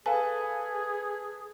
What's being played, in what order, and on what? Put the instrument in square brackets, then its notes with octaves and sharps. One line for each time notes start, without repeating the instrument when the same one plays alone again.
[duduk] G#4 [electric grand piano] A4 B4 A5 [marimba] F5 G#5